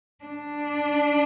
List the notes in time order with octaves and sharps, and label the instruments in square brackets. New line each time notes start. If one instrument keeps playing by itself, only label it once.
[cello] D4